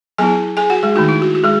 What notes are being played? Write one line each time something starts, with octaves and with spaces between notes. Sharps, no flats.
F#3 B3 E4 G#4 G#5
G#4 G#5
F#4 F#5
G#3 G#4
D#3 A3 D#4 F#4
E4
F#4
F#4
G#3 G#4